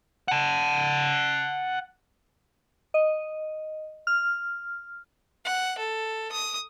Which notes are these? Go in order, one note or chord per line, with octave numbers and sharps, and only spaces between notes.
F#5 A5
D#5
F6
F#5
A4
D#6